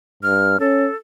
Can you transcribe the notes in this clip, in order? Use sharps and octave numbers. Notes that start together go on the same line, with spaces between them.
G2 F6
C#4 A4